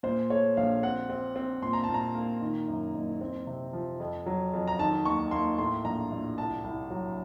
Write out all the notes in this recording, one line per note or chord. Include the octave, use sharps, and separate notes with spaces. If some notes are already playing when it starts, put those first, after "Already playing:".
A#2 C5
A3 C#5
A#1 F5
C4 F#5
C4
C4
A#2 C6
A#5
A5
A#2
A#5
A#3
D#3
F#2
F#1
C4
C3
F3
F2
F#3
F2
A#5
D#3 A5
D#2 C#6
A#3 C6
A2 C6
A#1 A#5
A#1
C2 A5
C2
F#3